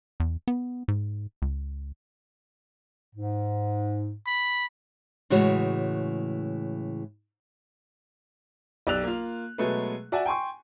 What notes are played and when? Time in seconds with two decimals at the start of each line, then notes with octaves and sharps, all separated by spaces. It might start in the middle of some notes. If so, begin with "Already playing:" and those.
0.20 E2
0.48 B3
0.88 G#2
1.42 C#2
3.15 G#2
4.27 B5
5.30 A2 C#3 E3 G#3 F#4 C#5
8.87 B1 G4 D5 E6 F#6 F7
9.04 A#3 F4
9.58 B2 F#3 G#3 A3 G#4 B4
10.12 F#4 D5 E5 F#5 G#5
10.26 G5 G#5 C6 C#6